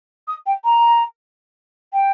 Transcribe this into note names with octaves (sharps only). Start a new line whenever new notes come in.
D#6
G5
A#5
G5